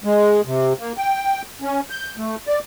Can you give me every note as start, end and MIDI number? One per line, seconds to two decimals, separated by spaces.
0.04 0.41 56
0.45 0.73 48
0.79 0.93 58
0.97 1.42 79
1.62 1.81 61
1.90 2.15 91
2.17 2.36 57
2.47 2.59 74